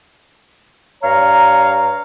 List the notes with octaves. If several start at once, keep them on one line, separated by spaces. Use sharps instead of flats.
G2 C#5 F5 A#5